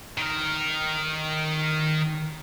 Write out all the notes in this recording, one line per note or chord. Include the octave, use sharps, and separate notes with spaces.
D#3 A#4